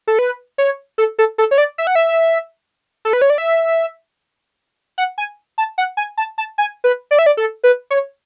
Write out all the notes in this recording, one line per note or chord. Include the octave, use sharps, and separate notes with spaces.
A4
B4
C#5
A4
A4
A4
C#5
D5
E5
F#5
E5
A4
B4
C#5
D5
E5
F#5
G#5
A5
F#5
G#5
A5
A5
G#5
B4
D5
E5
D5
A4
B4
C#5